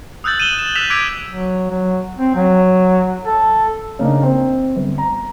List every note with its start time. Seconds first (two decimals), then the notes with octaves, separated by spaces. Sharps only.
0.24 D#6 E6 F#6 G6 A6 F#7
0.38 F#6 G6 D#7 E7 F#7 G7
0.59 E7
0.75 E6 F#6 B6 E7 F7
0.90 D6 E6 G#6 B6 D7
1.28 F#3
1.70 F#3
2.18 C4
2.35 F#3
3.25 A4
3.99 C#3 A#3 D4 D#4
4.22 C4
4.76 G1
4.98 A#5